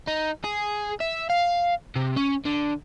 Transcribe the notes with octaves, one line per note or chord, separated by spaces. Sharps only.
D#4
G#4
E5
F5
C3
C#4
D3